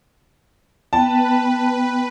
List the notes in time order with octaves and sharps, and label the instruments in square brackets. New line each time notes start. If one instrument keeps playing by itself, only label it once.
[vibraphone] B3 G5 [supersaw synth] B4 [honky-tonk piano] A5